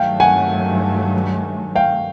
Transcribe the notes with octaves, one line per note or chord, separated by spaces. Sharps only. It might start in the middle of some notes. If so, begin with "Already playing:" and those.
Already playing: G2 D#3 F#3 A3 F5 G5
F#5 G#5
F5 G5